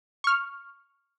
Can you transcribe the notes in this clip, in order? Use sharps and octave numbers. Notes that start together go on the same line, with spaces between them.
C#6 F6